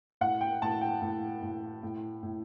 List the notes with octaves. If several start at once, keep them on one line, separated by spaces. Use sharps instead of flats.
A2 F#5
G5
A2 A5
G5
A2
A2
A2
A2